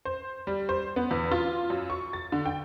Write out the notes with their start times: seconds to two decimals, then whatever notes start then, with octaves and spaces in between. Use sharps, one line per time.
0.05 C5
0.47 G3
0.69 C5
0.96 B3
1.11 E2
1.31 F4
1.70 F#2
1.90 C#6
2.13 A6
2.32 D3
2.46 G5